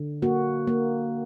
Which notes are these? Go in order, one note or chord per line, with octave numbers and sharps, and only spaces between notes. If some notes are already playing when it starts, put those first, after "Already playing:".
Already playing: D3
A#3 F#4
A#3